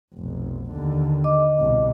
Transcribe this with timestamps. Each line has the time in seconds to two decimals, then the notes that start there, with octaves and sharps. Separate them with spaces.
0.14 F1 B1
0.71 D#2 D3
1.24 D#5 D6
1.59 C2 B2